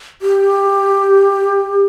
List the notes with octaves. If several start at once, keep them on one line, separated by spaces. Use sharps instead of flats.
G4